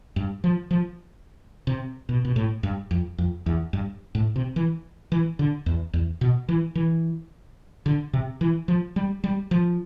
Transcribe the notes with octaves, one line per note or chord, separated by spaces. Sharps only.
G2
F3
F3
C3
B2
B2
A2
G2
F2
F2
E2
G2
A2
C3
E3
E3
D3
E2
E2
B2
E3
E3
D3
C3
E3
F3
G3
G3
F3